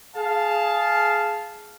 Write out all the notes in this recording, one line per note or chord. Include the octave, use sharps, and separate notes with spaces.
G#4 F5 A5